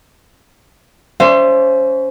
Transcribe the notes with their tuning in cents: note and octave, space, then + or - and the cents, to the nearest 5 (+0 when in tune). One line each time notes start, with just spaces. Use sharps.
C#4 +25 C5 +0 E5 +35